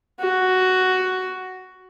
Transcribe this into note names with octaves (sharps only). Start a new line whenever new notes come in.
F#4